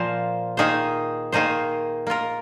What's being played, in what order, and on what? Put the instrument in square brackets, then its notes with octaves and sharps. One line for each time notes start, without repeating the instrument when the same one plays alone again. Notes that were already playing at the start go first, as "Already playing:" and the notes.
Already playing: [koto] A#2 F3 A#3 F4 C5
D#3 A#3 D#4 G#4 C5
D#3 A#3 D#4 G#4 C5
A#3 F4 A#4